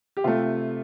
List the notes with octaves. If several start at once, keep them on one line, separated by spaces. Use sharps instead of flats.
G4
C3 A3 F4